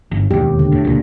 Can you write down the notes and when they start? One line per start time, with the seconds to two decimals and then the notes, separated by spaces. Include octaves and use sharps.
0.12 G1
0.31 E1 D#2 G4
0.59 D3
0.72 A2
0.85 C#2 A#2